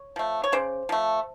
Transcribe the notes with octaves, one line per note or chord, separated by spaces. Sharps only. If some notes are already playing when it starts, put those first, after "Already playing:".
Already playing: C#5
F3 A3
C#5
C#3 C5 D5
F3 A3